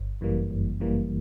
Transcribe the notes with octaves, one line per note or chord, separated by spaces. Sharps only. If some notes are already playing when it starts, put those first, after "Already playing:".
Already playing: G1
F#2 E3 G3 A#3
G1
F#2 E3 G3 A#3